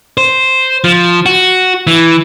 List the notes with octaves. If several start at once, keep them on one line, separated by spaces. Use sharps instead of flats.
C5
F3
F#4
E3